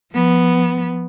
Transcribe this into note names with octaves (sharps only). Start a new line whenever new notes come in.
F3 B3